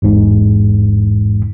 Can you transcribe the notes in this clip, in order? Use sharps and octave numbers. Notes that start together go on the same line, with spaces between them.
A1 E2 G#2